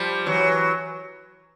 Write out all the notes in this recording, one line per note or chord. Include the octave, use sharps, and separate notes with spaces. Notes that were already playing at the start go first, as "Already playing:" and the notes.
Already playing: F3 G3
E3 F#3